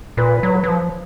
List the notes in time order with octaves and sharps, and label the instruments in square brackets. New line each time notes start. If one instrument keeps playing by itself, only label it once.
[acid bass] A#2 [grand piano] B4
[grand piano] B4
[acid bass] F#3
[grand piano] B4
[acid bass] F#3
F3